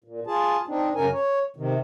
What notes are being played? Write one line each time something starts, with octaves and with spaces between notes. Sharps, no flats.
A#2
F4 G#4 A5
C4 D4 D#4
F#2 C#3 A#4 G#5
C#5
C3 D#3